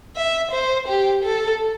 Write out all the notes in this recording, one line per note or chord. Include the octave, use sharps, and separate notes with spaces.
E5
C5
G4
A4